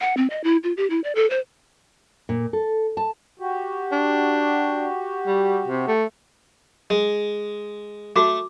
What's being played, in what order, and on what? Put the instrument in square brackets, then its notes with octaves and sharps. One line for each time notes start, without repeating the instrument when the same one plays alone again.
[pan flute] F#5
C4
D#5
E4
F4
G4
E4
D5
A4
C5
[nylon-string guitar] A#2
A4
A5
[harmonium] F#4 G4
[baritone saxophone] D4
G3
C3
A3
[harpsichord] G#3
[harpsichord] A3 [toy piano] F#4 D6